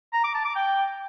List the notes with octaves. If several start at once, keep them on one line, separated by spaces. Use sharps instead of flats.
A#5
D6
A5
D6
G5